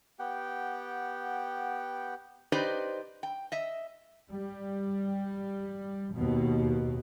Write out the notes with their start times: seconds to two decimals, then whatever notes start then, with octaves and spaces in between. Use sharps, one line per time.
0.19 B3 G4 F#5 G5
2.52 D#4 G4 B4 C5 D5 D#5
3.23 G5
3.52 D#5 E5
4.31 G3
6.15 D#2 B2